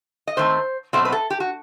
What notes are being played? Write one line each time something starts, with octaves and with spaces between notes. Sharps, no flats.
D#5
D#3 A3 C4 C5
B2 F#3 A3 C4 C5
B4
A4
G4
F#4